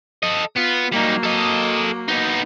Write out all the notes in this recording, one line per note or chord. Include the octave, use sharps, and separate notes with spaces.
A4 D#5
B3 F4
F#3 G3 A#3 D#4
A4 D#5
B3 D#4